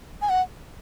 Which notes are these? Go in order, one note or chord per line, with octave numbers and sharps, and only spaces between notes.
G#5
F#5